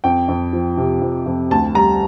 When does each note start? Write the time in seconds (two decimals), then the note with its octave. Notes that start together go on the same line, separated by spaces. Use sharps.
0.04 F2 G5
0.28 F2
0.53 F3
0.77 C3
1.01 F2
1.26 F2
1.51 D2 A5
1.75 G3 A#5